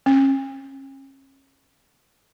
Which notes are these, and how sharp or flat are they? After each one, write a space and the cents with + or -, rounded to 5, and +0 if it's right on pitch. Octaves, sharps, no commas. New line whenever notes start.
C#4 -35